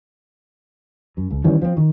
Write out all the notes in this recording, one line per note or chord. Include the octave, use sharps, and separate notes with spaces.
F#2
C#2
D#3 E3 G3 C#4
F3 C4
D#3